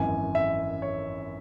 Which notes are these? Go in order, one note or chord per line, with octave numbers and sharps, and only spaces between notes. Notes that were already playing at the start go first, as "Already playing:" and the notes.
Already playing: G#1 F#2 E3 G#5
E5
C#5